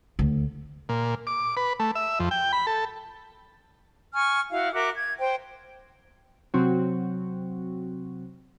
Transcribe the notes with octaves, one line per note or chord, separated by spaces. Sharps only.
D2
A#2
D6
B4
A3
E5
F2
G5
B5
A4
G#5 C#6 F6
E4 F#4 F5
F#4 A#4 E5 D6
G#6
C5 G5
C3 F#3 C4 F#4